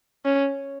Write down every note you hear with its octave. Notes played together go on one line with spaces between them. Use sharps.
C#4